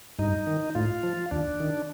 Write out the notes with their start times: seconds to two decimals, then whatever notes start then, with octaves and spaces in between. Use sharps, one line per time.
0.19 G2 D#4
0.47 D#3
0.75 A2 F4
1.03 F3
1.31 D#2 D4
1.60 D#3